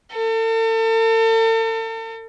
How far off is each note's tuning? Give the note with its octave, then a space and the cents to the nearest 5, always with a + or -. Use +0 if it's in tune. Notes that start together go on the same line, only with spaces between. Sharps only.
A4 +40